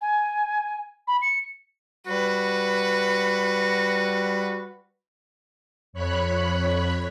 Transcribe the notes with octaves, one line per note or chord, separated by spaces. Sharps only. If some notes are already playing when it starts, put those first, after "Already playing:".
G#5
B5
C#7
G3 F#4 B4
F2 C#5 B5 F#6